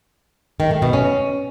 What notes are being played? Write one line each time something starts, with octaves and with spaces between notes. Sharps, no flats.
D#3
A3
B2
C#4